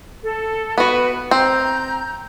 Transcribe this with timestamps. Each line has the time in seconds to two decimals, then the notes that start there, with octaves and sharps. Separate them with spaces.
0.22 A4
0.78 B3 F#4 B4
1.31 C4 A#5 G6